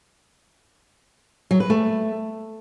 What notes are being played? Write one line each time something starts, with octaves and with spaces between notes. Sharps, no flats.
F#3
B4
A3